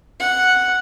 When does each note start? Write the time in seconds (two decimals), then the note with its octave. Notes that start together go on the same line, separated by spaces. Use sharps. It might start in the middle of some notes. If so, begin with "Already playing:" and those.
0.20 F#5